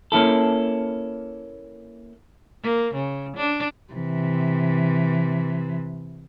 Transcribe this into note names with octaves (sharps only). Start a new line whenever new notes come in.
A#3 C#4 E4 A4
A#3
C#3
D4
C3 E3